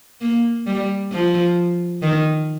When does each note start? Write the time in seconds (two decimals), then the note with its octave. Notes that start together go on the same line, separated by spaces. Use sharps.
0.21 A#3
0.67 G3
1.12 F3
2.02 D#3